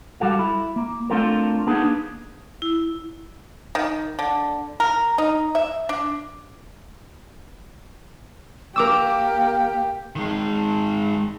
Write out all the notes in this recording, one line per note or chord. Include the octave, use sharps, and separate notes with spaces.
G3 F#4 A4 F5
E4
A#3
A3 C4 D4 F4 A4 A#4
A#3 B3 D4 D#4 G#4
E4
D#3
D3
A#4
D#4
E5
D4
A#3 G4 A#4 D6 E6
D#3 G#3